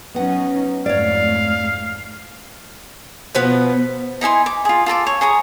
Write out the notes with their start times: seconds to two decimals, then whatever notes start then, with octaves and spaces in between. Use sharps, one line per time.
0.14 F#3 B3 C#4 D#4 F#5
0.86 F2 G#2 A3 C#5 D5 F5
3.35 B2 F3 B3
4.21 D#4 E4 G#5 C6
4.46 D6
4.65 F4 G#4
4.86 F4 A4 A#5 D6
5.07 C#5
5.21 G#4 C#5 A#5 D#6